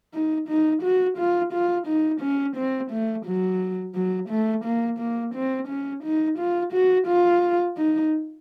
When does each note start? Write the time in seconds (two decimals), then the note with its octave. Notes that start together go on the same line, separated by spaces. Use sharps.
0.14 D#4
0.49 D#4
0.83 F#4
1.18 F4
1.53 F4
1.87 D#4
2.21 C#4
2.56 C4
2.91 A3
3.26 F#3
3.95 F#3
4.30 A3
4.65 A#3
4.99 A#3
5.35 C4
5.68 C#4
6.04 D#4
6.39 F4
6.73 F#4
7.07 F4
7.77 D#4